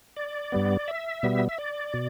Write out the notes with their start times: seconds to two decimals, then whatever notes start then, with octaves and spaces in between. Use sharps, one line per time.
0.17 D5
0.52 G2 G3 B3
0.88 E5
1.23 B2 G3 B3
1.49 E5
1.59 D5
1.94 B2